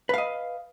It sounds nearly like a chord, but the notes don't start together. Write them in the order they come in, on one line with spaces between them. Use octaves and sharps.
B4 F5 D#5